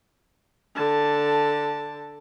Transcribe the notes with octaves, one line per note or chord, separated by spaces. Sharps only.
D3 A5